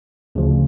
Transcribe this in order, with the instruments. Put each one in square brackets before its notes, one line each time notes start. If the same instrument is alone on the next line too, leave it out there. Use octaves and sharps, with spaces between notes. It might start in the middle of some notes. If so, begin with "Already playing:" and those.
[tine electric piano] D2 C#3 F3